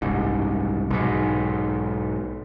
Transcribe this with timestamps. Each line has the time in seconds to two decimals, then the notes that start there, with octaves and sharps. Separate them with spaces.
0.02 F#1 C2 G#2
0.90 B1 G#2